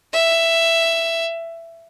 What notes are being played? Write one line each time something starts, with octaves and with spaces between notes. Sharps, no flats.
E5